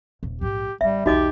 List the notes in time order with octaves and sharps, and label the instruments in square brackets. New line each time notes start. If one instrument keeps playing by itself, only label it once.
[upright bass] D#1
[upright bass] A#1 G#2 [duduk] G4
[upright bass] G#1 D3 [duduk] G3 [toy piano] E5
[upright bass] B1 E2 [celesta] D#4 [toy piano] F#4 D#5 D6 [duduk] G4